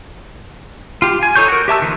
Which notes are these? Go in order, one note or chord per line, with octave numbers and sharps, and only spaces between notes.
F4 G4
G#5
D#4 A4 C#5 C#6 G6
F#4 A#4
G4 E5 A5 E6
D#3 F3 A#3 D#4